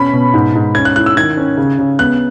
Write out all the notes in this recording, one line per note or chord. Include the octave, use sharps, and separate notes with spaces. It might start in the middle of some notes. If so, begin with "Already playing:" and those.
Already playing: B2 C#4 B5
B2
G#2
G#2
C#4 G#6
F#6
E4 F#6
E6
D#3 G#6
C#4
C#3
C#3
B3 F#6